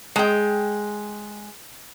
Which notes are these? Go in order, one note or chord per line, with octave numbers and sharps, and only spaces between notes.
G#3 G5